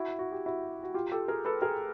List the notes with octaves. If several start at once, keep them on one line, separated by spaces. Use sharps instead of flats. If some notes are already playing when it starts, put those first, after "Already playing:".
Already playing: E4 F#4
F#4
G4
E4 F#4
F#4
F4 G4
G4 A4
G#4 A#4
A4 B4
G#4 A#4